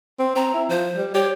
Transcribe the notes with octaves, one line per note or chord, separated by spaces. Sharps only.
C4
C4 A#5
E4
F3 C5
G3
G4 C#5